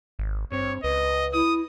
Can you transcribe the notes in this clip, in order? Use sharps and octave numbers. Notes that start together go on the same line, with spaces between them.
G#1
G2 C4 C#5
C#2 B4 D#5
E4 D#6